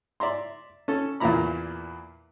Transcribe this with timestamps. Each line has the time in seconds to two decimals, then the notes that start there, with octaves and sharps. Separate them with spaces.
0.20 D5 E5 A#5 C6
0.88 C#4 A4
1.20 E2 A#2 A#3 E4 A#5 B5